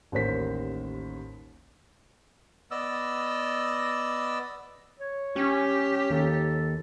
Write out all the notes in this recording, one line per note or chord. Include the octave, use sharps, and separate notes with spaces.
A1 D#2 A#4 C5 B6
B3 D5 D#5 E6
C#5
C#4 G4
D#2 A4